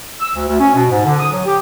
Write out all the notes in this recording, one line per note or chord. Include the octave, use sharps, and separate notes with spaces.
E6
D2
D2
C#4
B2
G#2
D3
D#6
F#3
G4